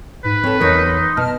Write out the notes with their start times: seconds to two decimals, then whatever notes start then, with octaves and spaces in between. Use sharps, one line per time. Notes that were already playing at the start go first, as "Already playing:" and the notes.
0.24 G#2 B4
0.44 C4 A4 C#5
0.60 E2 D#4 A#4 C#5
0.86 C6
1.17 B2 A5 F6